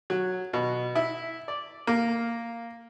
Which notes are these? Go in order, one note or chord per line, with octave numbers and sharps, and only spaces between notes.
F#3
B2
E4
D5
A#3